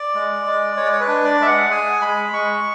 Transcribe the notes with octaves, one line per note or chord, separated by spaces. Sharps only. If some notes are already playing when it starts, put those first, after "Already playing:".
Already playing: D5
G#3
G#3
G#3 C#5
D5
C#5
B4
D4
D5
G#3 E5
F#5
G#4 G#5
G#3 B5
G#3 C#6